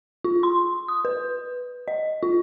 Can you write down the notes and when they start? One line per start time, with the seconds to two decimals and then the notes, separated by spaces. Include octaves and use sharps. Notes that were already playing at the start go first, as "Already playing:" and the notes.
0.24 F4
0.43 C6
0.88 D#6
1.05 B4
1.88 D#5
2.23 F4